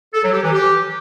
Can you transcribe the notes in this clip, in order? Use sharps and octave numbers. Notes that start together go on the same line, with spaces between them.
A4
F#3
G4
E3
G4